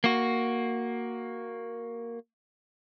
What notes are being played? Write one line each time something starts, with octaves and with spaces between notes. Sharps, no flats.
A#3 F#4